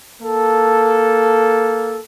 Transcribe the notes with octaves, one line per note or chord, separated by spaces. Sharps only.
A#3 A4